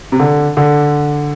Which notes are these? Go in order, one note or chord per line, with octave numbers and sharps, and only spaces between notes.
C3
D3
D3